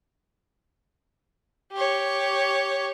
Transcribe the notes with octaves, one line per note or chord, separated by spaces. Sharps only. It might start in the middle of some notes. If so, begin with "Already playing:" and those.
G4 C#5